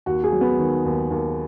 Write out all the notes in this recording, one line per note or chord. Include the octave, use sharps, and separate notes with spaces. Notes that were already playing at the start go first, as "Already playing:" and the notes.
D#2 F#4
G#4
F#3
B3
D#3
D#2
D#2